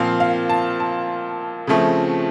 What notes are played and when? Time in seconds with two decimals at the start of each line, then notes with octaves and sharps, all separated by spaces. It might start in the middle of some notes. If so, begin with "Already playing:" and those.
Already playing: A#2 F3 C4 F5
0.20 F5
0.49 A5
0.80 A5
1.67 C#3 F3 A3 C4